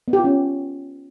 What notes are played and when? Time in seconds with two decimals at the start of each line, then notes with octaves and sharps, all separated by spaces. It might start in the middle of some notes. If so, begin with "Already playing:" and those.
0.08 B3
0.13 G4
0.19 F4
0.24 C#4